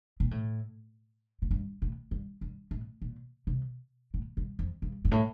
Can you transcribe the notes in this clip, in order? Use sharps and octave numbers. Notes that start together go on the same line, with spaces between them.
A#2
A2
A2
G2
A2
G2
G2
A2
A#2
C3
A2
G2
F2
G2
G2
A2